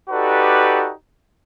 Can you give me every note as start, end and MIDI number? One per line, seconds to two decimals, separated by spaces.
0.10 0.92 63
0.10 0.92 66
0.10 0.92 67
0.10 0.92 69
0.10 0.92 71
0.10 0.92 74